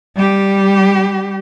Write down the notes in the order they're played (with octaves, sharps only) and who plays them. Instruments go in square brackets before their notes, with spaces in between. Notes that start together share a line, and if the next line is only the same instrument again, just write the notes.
[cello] G3 G4